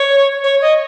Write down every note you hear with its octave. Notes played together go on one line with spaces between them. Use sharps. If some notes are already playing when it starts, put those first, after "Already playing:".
Already playing: C#5
C#5
D#5